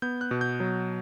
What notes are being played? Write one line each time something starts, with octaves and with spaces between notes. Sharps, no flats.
B3 G6
F#6
B2
G6
F#3